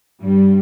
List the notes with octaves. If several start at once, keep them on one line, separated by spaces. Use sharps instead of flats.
G2 G3